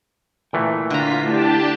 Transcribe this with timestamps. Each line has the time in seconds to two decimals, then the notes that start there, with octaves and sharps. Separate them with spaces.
0.53 A#2 E3 A3 G5
0.90 D3 F4 A#5 B6
1.23 A2 D4 E4 G4 A5